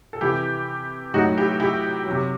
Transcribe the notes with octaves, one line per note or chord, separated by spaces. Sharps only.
A4
C3 E3 E4 G4
A2 F#3 D#4 F#4
E4 G4
E4 G4
C3 F#3